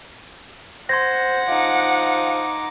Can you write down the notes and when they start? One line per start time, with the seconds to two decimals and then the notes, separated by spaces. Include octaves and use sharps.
0.89 C5 F#5 C6 G#6 A#6
1.48 F3 D#4 D6